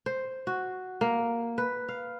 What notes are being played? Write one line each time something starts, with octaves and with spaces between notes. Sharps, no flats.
C5
F#4
A#3
B4
F5